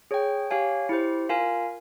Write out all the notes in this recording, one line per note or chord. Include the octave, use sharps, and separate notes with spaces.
G#4 C#5 G5
G4 C#5 F5 G#5
E4 G4 C5
F4 A#4 F5 G#5